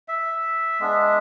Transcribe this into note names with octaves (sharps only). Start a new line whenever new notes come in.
E5
G#3 B3 D4